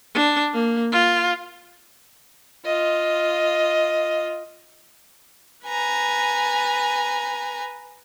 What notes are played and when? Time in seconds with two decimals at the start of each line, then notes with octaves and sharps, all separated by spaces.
0.15 D4
0.53 A#3
0.92 F4
2.65 F4 D#5
5.65 B4 G#5 A#5